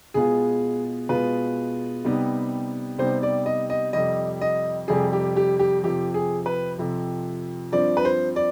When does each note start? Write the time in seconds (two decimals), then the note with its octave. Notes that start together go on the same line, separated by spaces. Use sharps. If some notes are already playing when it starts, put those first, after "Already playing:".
0.14 B2 G#3 B3 F4 G#4
1.09 B2 G#3 B3 F4 B4
2.04 C3 G3 B3 D#4
2.98 C3 G3 B3 D#4 C5
3.23 D5
3.46 D#5
3.70 D#5
3.93 F2 C3 G3 D#5
4.41 D#5
4.88 F2 C3 G3 G#4
5.13 G4
5.36 G4
5.59 G4
5.83 F2 C3 F3 G4
6.14 G#4
6.46 B4
6.78 F2 C3 F3
7.72 G2 F3 C4 D5
7.97 B4
8.05 C5
8.36 D5